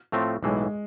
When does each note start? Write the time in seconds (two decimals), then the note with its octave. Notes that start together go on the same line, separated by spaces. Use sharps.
0.12 A2 F3 A3 C4
0.43 B1 A2 E3 G#3